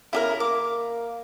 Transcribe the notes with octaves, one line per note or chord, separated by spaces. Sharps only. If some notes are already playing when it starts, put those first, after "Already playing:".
C#3 E4 G4 A#4
A#3 D6